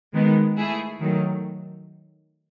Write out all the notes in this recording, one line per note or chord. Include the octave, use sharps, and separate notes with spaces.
D#3 G#3 B3
A3 E4 G#4
D#3 F#3 A3